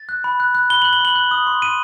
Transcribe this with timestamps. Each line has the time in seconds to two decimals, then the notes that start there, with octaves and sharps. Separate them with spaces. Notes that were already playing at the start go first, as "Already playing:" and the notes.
Already playing: A6
0.09 F#6
0.24 B5
0.40 F#6
0.55 F#6
0.70 B5 G7
0.82 F#6 F#7
0.93 G7
1.00 B5 F#7
1.15 F#6
1.31 D#6
1.47 C6
1.62 C6 D#7